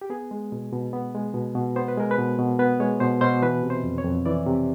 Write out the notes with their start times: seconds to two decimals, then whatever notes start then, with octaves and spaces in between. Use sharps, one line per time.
0.01 G4
0.10 B3 G#4
0.31 G#3
0.52 B2
0.72 B2
0.93 B3
1.15 G#3
1.34 B2
1.55 B2
1.76 B3 C5
1.88 B4
1.97 G#3 A#4
2.11 B4
2.18 B2
2.38 B2
2.59 B3 B4
2.80 G#3 C#5
3.00 B2 C5
3.21 B2 C5
3.42 E3 B4
3.63 C3
3.70 C5
3.84 F2
3.98 C#5
4.05 F2
4.26 E3 D5
4.46 C3